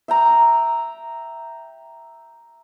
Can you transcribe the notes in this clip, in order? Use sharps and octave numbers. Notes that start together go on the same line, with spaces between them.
E5 G5 A#5